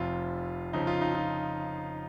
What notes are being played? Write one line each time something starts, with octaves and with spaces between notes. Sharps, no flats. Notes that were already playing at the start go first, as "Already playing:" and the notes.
Already playing: F1 F2 C3 F4
F2 C#3 F3 D#4
F4
D#4
F4